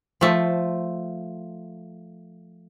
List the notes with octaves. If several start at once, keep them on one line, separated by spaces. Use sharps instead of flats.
F3 A3